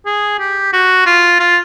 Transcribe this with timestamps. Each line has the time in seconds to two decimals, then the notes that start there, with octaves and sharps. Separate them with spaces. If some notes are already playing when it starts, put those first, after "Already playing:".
0.06 G#4
0.40 G4
0.73 F#4
1.06 F4
1.40 F4